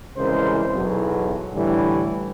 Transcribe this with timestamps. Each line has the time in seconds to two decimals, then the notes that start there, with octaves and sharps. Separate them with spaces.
0.17 C2 C#3 E3 G#3 A#4 C5
0.75 B1 E2 F#3
1.55 A2 D3 E3 G3